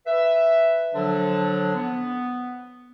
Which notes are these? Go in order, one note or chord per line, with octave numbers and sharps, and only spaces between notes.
B4 E5
D3 F3 F#3 D4
B3